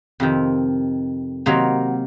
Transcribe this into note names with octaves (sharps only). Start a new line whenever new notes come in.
F2 C3 D#3
C3 D#3 F#3 A#3 D#4